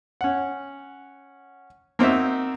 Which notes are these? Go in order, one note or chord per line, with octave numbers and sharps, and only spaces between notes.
C#4 F#5
A#3 C4 D#4 F#4 E5